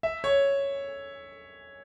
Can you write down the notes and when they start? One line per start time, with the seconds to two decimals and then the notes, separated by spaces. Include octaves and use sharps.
0.03 E5
0.24 C#5